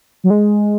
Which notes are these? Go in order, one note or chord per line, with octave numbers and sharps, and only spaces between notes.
F#3
G#3